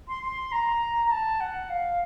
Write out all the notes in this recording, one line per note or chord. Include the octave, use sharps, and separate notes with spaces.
C6
C6
A#5
A#5
A5
F#5
F5